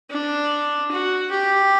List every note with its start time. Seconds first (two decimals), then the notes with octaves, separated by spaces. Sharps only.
0.10 D4
0.91 F#4
1.31 G4